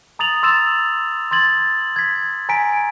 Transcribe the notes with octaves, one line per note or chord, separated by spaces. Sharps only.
A#5 D#6 A6 F7 F#7
C6 E6 A6 E7 F7
C6 G#6 A6 F#7
G#6 B6
G#5 A#5 G#6 B6 D7